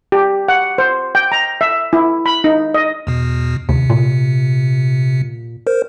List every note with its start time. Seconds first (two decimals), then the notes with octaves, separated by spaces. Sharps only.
0.12 G4
0.48 F#5
0.78 C5
1.15 G5
1.32 A#5
1.61 E5
1.93 E4
2.26 B5
2.44 D#4
2.74 D#5
3.07 E2 B2
3.69 D#2 C3
3.90 A#2
5.67 A#4 C5